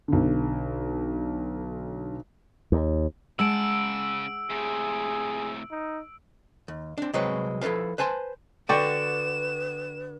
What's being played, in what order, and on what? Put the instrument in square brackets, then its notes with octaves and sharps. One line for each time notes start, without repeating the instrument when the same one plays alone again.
[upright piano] B1 D3
[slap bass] D#2
[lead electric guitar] C#3 A5 [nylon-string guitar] G#3 F#5 [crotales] E6 D7
[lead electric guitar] A2 C3 [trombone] G#4
[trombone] D#4
[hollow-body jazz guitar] D#2
C4 D4
C2 F#3 G#3 C4 B4 C#5
F3 E4 A4 B4 F5
B4 C5 G#5 A5 C6
[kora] D3 F#4 [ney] B4 [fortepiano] D5 G5 C#6 [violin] E7